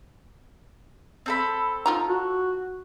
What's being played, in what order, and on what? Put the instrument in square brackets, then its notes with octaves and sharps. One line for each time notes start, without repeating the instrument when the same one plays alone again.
[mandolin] C4 A4 B5
[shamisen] D#4 F4 A#5
[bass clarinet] F#4